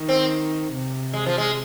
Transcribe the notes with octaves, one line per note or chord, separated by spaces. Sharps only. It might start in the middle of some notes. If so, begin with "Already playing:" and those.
Already playing: D#3
C4
C3
G#3
F3
G#3